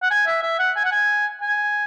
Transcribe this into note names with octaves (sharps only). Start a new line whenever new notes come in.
F#5
G#5
E5
E5
F#5
G#5
F#5
G#5
G#5